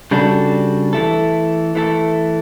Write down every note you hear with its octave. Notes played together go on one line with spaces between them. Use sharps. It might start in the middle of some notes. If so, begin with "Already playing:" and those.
C#3 G3 D4 F#4 A4
E3 A3 E4 A4
E3 A3 E4 A4